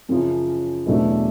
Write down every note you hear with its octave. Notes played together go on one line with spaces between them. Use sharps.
F#2 C#3 F3
E2 B2 F#3 A3 D4